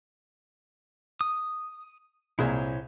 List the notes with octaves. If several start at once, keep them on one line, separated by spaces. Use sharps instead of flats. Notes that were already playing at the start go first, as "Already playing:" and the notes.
D#6
C2 A#2 E4 G#4 C5 C#5